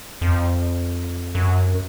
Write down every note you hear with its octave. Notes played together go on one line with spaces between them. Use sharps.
F2
F#2